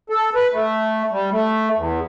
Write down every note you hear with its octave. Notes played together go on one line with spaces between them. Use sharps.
A4
B4
A3
G3
A3
E2